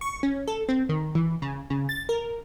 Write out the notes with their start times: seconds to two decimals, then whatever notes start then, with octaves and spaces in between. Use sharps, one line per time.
0.01 C#6
0.23 C#4
0.48 A4
0.69 C4
0.89 D#3
1.15 E3
1.42 C#3
1.70 C#3
1.89 A6
2.09 A#4